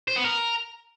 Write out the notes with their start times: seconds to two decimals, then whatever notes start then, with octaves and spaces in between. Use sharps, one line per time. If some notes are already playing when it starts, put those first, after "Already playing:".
0.08 C5
0.16 B3
0.25 A#4